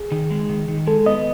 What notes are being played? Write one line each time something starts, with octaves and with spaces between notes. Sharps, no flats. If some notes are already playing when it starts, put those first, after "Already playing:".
Already playing: G#4
D#3
G#3
D#3
D#3
G#3 A4
B3 D#5